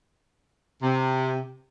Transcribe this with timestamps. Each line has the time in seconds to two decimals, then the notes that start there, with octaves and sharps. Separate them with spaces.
0.83 C3